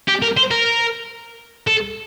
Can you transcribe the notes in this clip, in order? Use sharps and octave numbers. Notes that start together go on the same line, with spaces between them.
G4
A#4
C5
A#4
A4